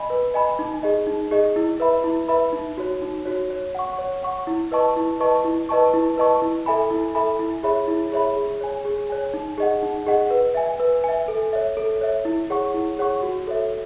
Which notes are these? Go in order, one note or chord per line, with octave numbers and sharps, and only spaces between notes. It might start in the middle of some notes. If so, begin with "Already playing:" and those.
Already playing: D#5 G#5 B5
B4
D#5 G#5 B5
D#4
G#4 D#5
D#4
G#4 D#5
E4
B4 E5 B5
E4
B4 E5 B5
D#4
F#4 C#5
D#4
F#4 C#5
C#5
F#5 C#6
C#5
F#5 C#6
E4
B4 D#5 A5 C#6
E4
B4 D#5 A5 C#6
E4
B4 D#5 A5 C#6
E4
B4 D#5 A5 C#6
E4
A4 E5 G#5 B5
E4
A4 E5 G#5 B5
E4
G#4 C#5 E5 B5
E4
G#4 C#5 E5 B5
G#4
C#5 G#5
G#4
C#5 G#5
D#4
G#4 D#5 F#5
D#4
G#4 D#5 F#5
B4
E5 G#5
B4
E5 G#5
A4
C#5 E5
A4
C#5 E5
E4
G#4 C#5 F#5 C#6
E4
G#4 C#5 F#5 C#6
F#4
A4 C#5 E5